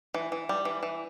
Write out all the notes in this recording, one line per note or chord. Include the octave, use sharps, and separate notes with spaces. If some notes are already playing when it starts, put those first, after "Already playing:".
E3
E3
G3
E3
E3